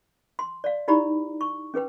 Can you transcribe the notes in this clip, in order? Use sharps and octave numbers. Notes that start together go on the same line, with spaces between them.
C6
D5 F5
D#4 E4 G4 D5 A#5 B5
C#6
C#4 G#4 B4 G5